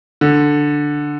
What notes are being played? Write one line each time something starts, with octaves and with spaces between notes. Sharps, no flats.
D3